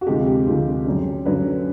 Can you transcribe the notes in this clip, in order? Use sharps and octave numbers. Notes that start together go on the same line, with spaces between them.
F#4
D2 C3 F3 G#3 G4
G4
D2 C3 F3 G#3
F#2 D3 F#3
F#2 D3 F#3 B4